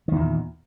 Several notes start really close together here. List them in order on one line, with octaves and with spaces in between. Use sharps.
D#3 E2 A#2